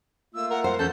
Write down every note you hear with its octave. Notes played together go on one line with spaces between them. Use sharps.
A3 A#3 F4 E6
A#4 F#5
C5 F#5
E2 D#3 C#4 A4 G6